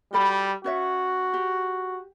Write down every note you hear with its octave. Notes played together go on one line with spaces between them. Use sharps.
G3 F#4 A4 B5
C#4 F#4 C#5 E5
G4